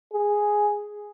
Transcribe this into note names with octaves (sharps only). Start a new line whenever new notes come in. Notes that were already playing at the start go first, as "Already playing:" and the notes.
G#4